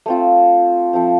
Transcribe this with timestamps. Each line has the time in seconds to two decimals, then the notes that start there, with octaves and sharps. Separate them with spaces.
0.06 A3 C4 F4
0.93 F3 A3 C4